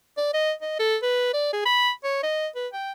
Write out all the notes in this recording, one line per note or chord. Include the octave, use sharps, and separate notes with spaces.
D5
D#5
D#5
A4
B4
D5
G#4
B5
C#5
D#5
B4
G5